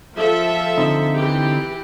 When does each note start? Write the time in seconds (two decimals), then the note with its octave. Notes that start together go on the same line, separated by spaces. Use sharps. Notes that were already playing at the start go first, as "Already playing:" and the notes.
0.16 F3 A4 E5
0.78 D3 C4 D#4
1.17 E3 G4